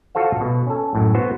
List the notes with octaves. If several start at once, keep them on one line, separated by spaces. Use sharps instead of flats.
F4 F#4 A4 C5 F5
B2
C#4 A4
F#2 A2
B3 F#4 C5